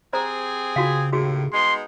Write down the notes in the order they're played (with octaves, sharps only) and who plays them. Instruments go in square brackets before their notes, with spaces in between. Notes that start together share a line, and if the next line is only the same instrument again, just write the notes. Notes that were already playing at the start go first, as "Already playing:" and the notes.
[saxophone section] C4 G4 G#4 [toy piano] C5 A#5
[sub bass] C#3 [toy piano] F4 F#4 F5
[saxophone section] D#2 A2 [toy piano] F#4 G#4
[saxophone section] G#3 B3 D#4 [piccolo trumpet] C6